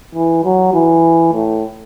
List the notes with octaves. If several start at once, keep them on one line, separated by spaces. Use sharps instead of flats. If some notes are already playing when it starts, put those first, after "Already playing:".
E3
F#3
E3
A2